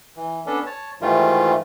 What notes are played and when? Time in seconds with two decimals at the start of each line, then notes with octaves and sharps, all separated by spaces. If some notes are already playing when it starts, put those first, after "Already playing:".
0.16 E3
0.46 B3 C#4 D4 A4
0.66 C#5 A5
1.01 G#2 D#3 E3 G3 A3 F4